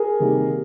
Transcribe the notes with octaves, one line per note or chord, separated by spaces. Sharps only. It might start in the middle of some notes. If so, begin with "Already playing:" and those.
Already playing: G#4 A#4
C3 D#3 G3 A#3